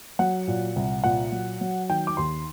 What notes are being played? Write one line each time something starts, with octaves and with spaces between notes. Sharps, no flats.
F#3 F#5
A#2
C2
A#2 F#5
F#3
F#3
D#3 G5
D6
D#2 C6